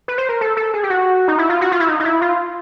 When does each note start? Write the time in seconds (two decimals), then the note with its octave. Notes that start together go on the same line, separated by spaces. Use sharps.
0.08 B4
0.18 C5
0.29 A#4
0.41 A4
0.57 A4
0.74 G#4
0.83 G4
0.90 F#4
1.28 D#4
1.38 E4
1.49 F4
1.61 F#4
1.72 F4
1.80 E4
1.88 D#4
2.00 D#4
2.05 E4
2.21 F4